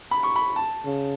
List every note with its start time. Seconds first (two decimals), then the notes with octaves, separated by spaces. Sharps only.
0.11 B5
0.23 C#6
0.36 B5
0.56 A5
0.85 C#3